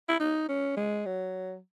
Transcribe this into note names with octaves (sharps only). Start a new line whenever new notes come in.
E4
D#4
C#4
G#3
F#3